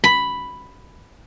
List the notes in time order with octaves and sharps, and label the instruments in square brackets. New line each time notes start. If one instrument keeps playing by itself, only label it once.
[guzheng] B5